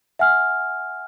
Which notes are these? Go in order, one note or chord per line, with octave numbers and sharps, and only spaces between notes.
E5 F#5 G#5 F6